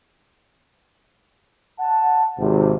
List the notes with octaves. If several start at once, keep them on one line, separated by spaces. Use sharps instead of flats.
F#5 A5
G#1 C3